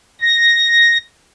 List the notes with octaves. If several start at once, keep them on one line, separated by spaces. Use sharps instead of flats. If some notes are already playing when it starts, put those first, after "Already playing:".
A#6